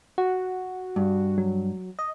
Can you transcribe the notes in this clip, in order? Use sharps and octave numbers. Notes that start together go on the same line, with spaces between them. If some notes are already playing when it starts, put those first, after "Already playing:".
F#4
G2
F#3
D#5